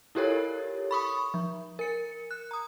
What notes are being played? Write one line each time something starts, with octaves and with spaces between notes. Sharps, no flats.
E4 F4 G4 A4 A#4 C#5
B5 C#6 D#6
F3
A#4 C#7
F#6
A#5 D#6